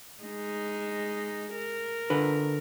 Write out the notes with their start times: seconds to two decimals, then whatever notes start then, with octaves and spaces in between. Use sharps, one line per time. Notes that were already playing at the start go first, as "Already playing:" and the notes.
0.24 G#3 D#4
1.54 A#4
2.10 D3 B4